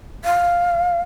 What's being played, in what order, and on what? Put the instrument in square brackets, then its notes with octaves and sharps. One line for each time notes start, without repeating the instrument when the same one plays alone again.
[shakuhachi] F5